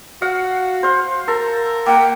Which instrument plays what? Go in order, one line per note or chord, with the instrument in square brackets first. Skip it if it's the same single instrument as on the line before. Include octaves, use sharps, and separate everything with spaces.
[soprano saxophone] F#4 [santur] F5 F#5
[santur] C5 F5 F#5
[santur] A4 [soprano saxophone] A#4
[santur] A#3 F#5 [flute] G5